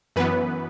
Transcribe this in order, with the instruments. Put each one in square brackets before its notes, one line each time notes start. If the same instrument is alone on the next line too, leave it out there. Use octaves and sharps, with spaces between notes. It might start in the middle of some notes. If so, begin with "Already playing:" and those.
[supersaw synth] F#2 E3 B3 B4